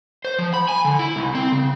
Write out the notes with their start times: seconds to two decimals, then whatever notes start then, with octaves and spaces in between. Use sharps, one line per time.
0.25 C5
0.39 F3
0.54 B5
0.68 G#5
0.85 D3
0.99 E4
1.16 C2
1.35 C4
1.52 C#3